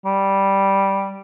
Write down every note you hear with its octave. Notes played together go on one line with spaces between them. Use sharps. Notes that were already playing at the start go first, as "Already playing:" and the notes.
G3